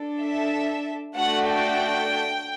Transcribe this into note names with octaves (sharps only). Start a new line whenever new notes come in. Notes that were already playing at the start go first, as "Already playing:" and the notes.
Already playing: D4 A4
E5
A3 D4 F#4 A4 F#5
G5